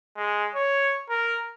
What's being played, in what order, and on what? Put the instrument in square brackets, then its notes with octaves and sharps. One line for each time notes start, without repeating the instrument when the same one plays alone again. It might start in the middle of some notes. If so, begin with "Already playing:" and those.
[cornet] G#3
C#5
A#4